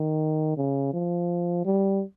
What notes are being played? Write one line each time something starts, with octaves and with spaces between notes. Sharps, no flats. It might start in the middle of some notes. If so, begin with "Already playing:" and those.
Already playing: D#3
C#3
F3
G3